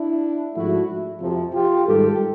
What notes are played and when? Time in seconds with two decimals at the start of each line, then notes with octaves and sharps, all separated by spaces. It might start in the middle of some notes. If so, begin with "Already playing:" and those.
Already playing: D4 E4
0.54 G#2 F3 A3 E4 F#4
1.21 F2 C3 F3
1.54 F4 G4
1.87 G#2 D#3 G3 G4 A4